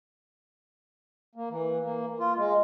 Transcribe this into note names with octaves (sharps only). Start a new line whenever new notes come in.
A#3
E3
A#3
F4
G#3